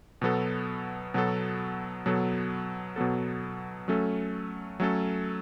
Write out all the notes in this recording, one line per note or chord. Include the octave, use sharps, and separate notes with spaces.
B2 F#3 B3 A4
B2 F#3 B3 A4
B2 F#3 B3 A4
B2 F#3 B3 A4
F#3 A3 C#4 A4
F#3 A3 C#4 A4